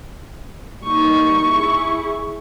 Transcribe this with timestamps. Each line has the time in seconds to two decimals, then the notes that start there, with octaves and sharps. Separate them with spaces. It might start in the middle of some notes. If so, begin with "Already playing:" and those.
0.84 G3 A#3 D#4 C#6
1.46 E4 G#4